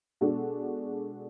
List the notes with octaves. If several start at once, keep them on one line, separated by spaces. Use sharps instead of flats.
B2 G#3 D4 F#4 A4